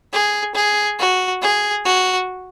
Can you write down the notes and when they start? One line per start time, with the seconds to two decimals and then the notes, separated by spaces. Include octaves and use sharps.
0.13 G#4
0.55 G#4
0.99 F#4
1.42 G#4
1.85 F#4